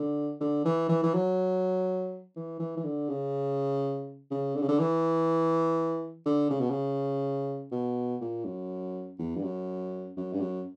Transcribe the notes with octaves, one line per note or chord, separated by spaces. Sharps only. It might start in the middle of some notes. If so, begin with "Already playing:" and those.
Already playing: D3
D3
E3
E3
E3
F#3
E3
E3
E3
D3
C#3
C#3
D3
C#3
D3
E3
D3
C#3
B2
C#3
B2
A#2
F#2
E2
G2
F#2
F#2
G2
F#2